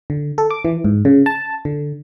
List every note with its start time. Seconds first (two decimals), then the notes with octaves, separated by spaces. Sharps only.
0.10 D3
0.38 A4
0.51 D6
0.65 E3
0.84 G#2
1.05 C#3
1.26 A5
1.65 D3